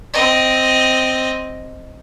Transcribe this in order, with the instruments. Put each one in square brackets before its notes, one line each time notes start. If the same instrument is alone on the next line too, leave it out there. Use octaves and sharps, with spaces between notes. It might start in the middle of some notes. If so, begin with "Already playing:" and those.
[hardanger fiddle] C4 D#5